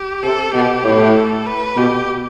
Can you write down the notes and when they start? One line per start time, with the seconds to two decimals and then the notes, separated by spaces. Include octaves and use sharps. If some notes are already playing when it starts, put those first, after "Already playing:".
Already playing: G4
0.23 C3 A4
0.53 B2 G4
0.84 A2
1.16 A4
1.46 B4
1.76 B2 G4